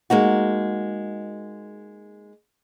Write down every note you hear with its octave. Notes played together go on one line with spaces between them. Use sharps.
G#3 A#3 D#4 F#4